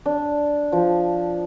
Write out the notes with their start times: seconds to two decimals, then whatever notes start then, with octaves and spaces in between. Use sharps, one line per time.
0.06 D4
0.72 F3